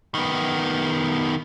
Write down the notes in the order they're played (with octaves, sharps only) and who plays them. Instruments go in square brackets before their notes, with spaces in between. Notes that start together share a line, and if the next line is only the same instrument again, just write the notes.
[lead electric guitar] D#3 B3